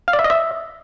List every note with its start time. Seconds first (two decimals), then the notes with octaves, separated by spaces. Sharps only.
0.08 F5
0.13 D5
0.19 E5
0.24 D#5
0.30 E5